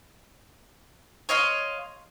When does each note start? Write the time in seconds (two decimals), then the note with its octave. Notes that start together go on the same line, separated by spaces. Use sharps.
1.29 C#5 D#5 F5 C6